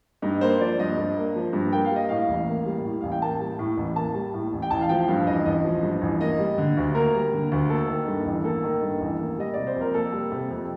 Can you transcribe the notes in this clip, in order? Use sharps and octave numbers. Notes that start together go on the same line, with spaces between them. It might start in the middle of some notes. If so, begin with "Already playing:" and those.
G2 D#4
A#3 C5
F3 D5
G2 D#5
G2
A#3
F3
G2
A#3 G5
F5
G3
D#5
A2 F5
A1
A#3
G3
A2
A1 F5
G5
A#3 A5
G3
A2
A1
A#3 A5
G3
A2
A1
G5
A1 A5
F5
F3 G5
G2 F5
A1 D#5
A1 D#5
F3
G2
A1
A#3 D#5
G3
D3
D2
A#3 A#4
G3
D3
D2
A#3 A4
D#3
G2
A1
A#3 A4
D#3
G2
A1
A#3
G3 D#5
C3 D5
C5
F2
A#4
A#3 A4
G3
C3
F2